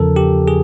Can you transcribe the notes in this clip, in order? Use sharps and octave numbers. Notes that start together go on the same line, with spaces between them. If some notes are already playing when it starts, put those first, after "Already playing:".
Already playing: E2 C#3 F3 A4 A#4
G4
G#4